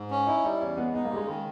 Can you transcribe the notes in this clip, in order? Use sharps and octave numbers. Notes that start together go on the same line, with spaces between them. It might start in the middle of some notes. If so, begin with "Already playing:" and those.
Already playing: G#2
C#4
D#4 E4
G3 D#4
E2 C#4
G#3 B3
B3 D#4
A#3
C#3 G3
G#3
D#3 G#3